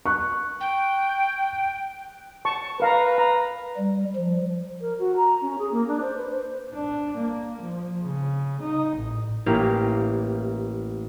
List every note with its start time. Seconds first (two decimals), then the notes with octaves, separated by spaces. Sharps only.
0.06 C#6 F#6
0.61 G5
2.45 A5 C#6
2.80 A#4 B4 F5 A#5
3.18 A#5
3.77 G3
4.16 F3
4.81 A#4
4.99 F#4
5.16 A#5
5.42 C#4
5.59 G#4
5.72 A#3
5.88 D4
6.01 C5
6.17 B4
6.30 C5
6.73 D4
7.17 A#3
7.61 F3
8.02 C#3
8.61 D#4
8.96 A1
9.46 A1 A#3 E4 G4 F5